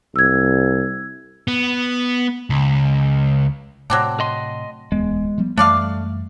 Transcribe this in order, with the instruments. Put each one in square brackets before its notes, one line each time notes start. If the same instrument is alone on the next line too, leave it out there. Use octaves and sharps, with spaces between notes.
[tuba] C2 [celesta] E6 G#6
[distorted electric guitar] B3
C#2
[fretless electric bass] A2 C3 [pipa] F#3 C4 D4
[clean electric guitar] D#5 C6
[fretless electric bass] D1 E2 B3 [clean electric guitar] G#3
[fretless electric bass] F3 G3 B3
[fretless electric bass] F#2 E3 G3 [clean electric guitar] A3 [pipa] D4 D5 F5